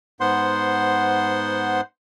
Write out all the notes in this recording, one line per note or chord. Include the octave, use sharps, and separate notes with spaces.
G#2 B3 C5 F#5 C6